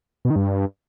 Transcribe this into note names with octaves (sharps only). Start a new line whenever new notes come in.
B2
D#3
G2